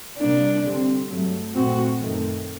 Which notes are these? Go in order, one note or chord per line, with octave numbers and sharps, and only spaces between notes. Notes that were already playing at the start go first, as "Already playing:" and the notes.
C3 G3 A#3 D4
D3 G3 C4
G2 F#3 A3
A#2 A3 C4 F#4
F#2 D#3 A3 C4